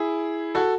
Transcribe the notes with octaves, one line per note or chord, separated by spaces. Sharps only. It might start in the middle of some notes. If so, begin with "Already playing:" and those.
Already playing: E4 G#4
F#4 A4